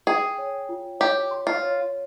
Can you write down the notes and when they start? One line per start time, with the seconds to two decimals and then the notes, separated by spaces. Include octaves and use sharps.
0.07 G#4 G5
0.38 C#5
0.69 F4
1.00 G4 C#5
1.31 C6
1.47 F4
1.62 C#5